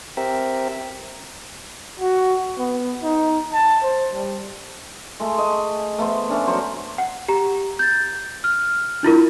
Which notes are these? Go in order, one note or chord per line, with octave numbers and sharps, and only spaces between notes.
C4 G4 A#4 E5
F#4
B3
D#4
A5
C5
G3
G#3 A3
D#5
A3 B3 C5
A3 C#4 D4
F#3 C5 A#5 C#6
F#5
G4 A#5
G6 A6
F6
D4 E4 F4 A#4